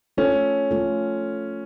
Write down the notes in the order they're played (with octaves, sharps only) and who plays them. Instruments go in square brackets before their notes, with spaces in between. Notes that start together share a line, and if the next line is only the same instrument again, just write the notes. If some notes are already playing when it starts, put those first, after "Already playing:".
[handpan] A3 F4 A4 [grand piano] C#4
[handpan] A3 F4 A4